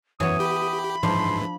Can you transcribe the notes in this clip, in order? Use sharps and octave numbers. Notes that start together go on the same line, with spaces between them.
F#2 E3 B3 C#5 D#6
G4 B5
G#2 E3 F3 D4 C6